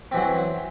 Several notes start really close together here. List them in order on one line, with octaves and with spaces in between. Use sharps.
C4 E3 F#3